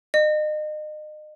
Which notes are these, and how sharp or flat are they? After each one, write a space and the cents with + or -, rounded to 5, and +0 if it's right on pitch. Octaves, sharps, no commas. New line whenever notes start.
D#5 -35